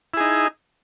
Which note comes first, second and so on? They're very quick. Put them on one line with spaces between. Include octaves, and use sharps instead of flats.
E4 G#4 D#4